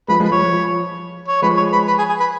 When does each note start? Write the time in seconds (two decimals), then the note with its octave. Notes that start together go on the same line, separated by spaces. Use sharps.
0.08 F3 G#3 B4
0.20 F3 G#3
0.25 B4
0.31 F3 C#5
0.42 F3
0.53 F3
1.28 C#5
1.42 F3 G#3 B4
1.57 C#5
1.72 B4
1.87 B4
1.99 G#4
2.09 G#4
2.20 B4